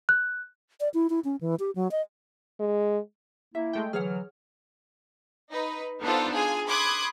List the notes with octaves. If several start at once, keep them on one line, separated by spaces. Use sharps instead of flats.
F#6
D5
E4
E4
C#4
E3
G4
F#3
D#5
G#3
A#3 E4 E5
G#3 A3 G5
D3 E3 F#3 G#4 C#5 F#5 F6
D#4 B4
B3 D4 D#4 F4 A4 C5
F4 G#4 G#5
B5 C6 D6 D#6 F#6 G#6